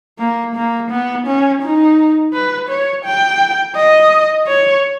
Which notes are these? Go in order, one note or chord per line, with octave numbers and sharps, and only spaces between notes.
A#3
A#3
B3
C#4
D#4
B4
C#5
G5
D#5
C#5